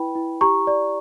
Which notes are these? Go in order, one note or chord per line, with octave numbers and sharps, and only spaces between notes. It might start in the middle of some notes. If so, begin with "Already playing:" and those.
Already playing: E4 B4 G5 B5
E4
G4 A#5 C#6
D5